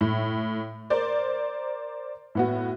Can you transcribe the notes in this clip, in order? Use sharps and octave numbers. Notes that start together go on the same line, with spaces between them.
A2
A#4 C5 D5
A2 B3 F#4